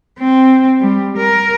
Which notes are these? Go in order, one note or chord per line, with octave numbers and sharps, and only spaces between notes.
C4
G3
A#4